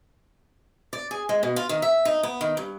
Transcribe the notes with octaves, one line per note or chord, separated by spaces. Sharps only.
D5
G#4
G#3
B2
F4
D#3
E5
D#4
B3
D#3
G2